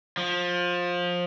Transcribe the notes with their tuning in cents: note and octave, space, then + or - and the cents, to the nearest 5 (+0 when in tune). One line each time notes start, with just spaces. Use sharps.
F3 +20